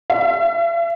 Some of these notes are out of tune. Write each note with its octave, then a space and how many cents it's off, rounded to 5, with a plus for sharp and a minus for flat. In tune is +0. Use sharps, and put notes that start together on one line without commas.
E5 +45